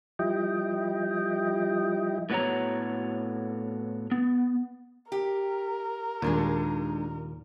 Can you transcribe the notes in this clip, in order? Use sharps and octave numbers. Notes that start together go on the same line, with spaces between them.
F3 G3 E4 D#5 G5
A2 B3 F#4 C#5 A#5
B3
G4 A#4
D#2 A#2 G#3 D4 D#4